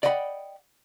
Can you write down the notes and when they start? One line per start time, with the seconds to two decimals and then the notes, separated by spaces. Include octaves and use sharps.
0.03 D5 D#5 F#5 G5 B5